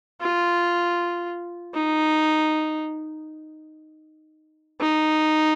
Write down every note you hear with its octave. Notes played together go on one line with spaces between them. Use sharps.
F4
D#4
D#4